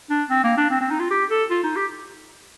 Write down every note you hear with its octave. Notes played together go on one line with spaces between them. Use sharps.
D4
C4
A#3
D4
C4
C4
D#4
F4
G4
A4
F4
D#4
G4